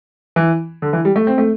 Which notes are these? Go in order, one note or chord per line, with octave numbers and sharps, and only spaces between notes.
E3
D3
E3
G3
A3
C4
A3